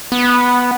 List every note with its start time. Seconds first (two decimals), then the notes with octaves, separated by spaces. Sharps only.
0.12 B3